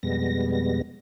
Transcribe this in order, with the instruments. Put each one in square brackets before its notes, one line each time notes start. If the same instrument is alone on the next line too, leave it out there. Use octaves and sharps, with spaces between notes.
[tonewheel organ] F2 B2 G3 G#3 B3 A#6